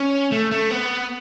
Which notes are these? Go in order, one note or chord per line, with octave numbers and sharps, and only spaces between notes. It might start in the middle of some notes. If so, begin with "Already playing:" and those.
Already playing: C#4
A3
A3
B3